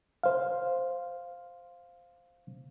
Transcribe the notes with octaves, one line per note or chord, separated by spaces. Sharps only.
C5 F5